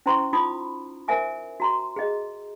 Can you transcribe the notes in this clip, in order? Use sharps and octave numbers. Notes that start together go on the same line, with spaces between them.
C#4 E4 C5 A#5 C6 C#6
D#4 F4 B5 D6 D#6
A#4 C5 E5 G#5 D6
F#4 A#5 C6
G#4 D#5